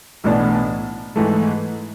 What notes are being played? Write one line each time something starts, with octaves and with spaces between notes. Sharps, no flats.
B1 A2 E3 B3 D4
G#2 E3 A3